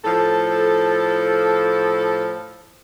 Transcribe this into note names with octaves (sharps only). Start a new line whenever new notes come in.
A2 F3 A4